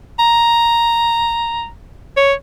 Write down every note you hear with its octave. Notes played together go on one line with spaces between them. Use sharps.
A#5
C#5